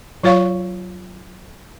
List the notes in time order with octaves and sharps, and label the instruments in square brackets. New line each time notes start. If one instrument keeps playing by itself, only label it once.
[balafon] F#3 F4 C#5 F5 C#6